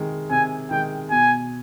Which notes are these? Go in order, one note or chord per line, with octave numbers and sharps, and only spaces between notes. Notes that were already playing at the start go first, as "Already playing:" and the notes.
Already playing: C3 D#3 G#3
C3 G#5
D#3 G#3 G5
B2 G#5